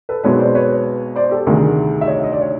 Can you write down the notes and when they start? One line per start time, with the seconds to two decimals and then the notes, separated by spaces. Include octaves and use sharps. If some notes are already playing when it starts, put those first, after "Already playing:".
0.09 A4 B4
0.23 B1 B2 G#3 C4 B4 C#5
0.39 C5 D5
0.55 B4 C#5
1.16 C5 D5
1.31 G4 A4
1.46 D2 C3 D#3 G3 G#4 A#4
2.01 E5
2.07 C#5 D#5
2.23 D#5
2.33 D5
2.41 C#5